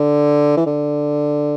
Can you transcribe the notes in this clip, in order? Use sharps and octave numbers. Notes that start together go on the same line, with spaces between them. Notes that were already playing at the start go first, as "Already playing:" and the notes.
Already playing: D3
E3
D3